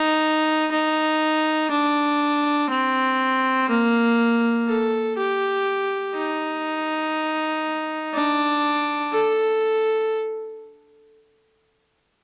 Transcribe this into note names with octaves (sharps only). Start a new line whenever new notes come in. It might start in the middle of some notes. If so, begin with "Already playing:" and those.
Already playing: D#4
D#4
D4
C4
A#3
A4
G4
D#4
D4
A4